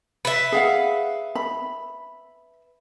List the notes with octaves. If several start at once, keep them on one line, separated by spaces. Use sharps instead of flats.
B4 E5
G#4 F5 F#5
B5